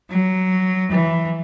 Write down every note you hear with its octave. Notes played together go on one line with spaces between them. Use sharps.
F#3
E3